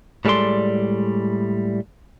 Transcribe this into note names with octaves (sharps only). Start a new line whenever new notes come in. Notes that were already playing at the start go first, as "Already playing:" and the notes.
A2 G3 G#3 A4 D5 C6